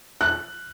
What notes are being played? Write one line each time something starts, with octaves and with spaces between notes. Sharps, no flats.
F#6